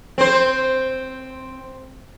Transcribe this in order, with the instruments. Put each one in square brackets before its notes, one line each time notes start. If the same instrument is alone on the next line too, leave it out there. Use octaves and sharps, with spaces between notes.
[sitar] C4 C5